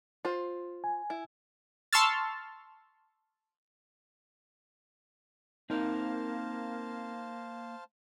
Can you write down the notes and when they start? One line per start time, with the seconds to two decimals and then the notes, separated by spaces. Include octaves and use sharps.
0.25 F4 C5
0.84 G#5
1.10 E4
1.93 A5 C6 C#6 E6 F6 A6
5.70 A#3 C4 D#4 A#4 C5 F5 A5